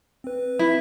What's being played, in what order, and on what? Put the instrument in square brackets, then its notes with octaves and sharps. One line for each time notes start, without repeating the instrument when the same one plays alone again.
[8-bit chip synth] C4 B4
[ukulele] E4